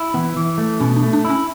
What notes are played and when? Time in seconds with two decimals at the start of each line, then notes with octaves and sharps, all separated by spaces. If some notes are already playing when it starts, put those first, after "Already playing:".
Already playing: E4
0.14 E3 B3
0.36 E3
0.58 A3
0.80 B2 C#4
0.97 D4
1.02 A3
1.13 D4
1.25 C#4 E4